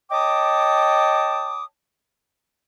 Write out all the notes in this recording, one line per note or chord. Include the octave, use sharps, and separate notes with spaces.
C#5 D#5 G5 A5 D6 D#6